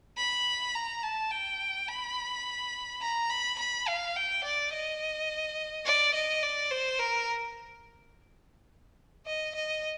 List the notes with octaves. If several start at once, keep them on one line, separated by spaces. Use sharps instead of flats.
B5
A#5
A5
G5
B5
A#5
B5
B5
F5
G5
D5
D#5
D5
D#5
D5
C5
A#4
D#5
D#5